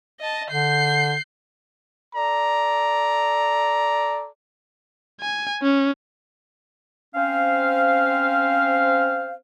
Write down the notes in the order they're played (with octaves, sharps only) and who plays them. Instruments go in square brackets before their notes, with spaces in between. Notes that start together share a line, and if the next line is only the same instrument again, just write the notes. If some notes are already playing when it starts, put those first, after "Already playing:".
[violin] D#5 A5
[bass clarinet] D3 [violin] G6 C7
[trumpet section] A4 D5 A#5
[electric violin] G#5
C#4
[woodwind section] C4 C#4 C5 F5